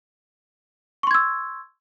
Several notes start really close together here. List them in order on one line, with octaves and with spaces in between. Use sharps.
C#6 C6 G#6 E6